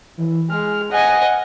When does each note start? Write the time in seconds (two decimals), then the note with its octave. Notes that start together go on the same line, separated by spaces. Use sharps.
0.17 E3
0.50 G#3 F6
0.91 D#5 F#5 G#5